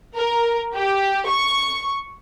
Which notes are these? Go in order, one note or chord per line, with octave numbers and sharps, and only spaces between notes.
A#4
G4
C#6